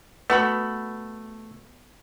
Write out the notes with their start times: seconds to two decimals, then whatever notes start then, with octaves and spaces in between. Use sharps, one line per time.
0.30 A3 B3 F#4 B5